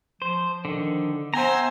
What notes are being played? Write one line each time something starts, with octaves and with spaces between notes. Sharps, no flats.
F3 C5
D3 D#3
B3 C5 E5 G5 G#5 A#5